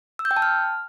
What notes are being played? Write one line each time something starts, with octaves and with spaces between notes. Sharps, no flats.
E6
G6
G5
A5
F6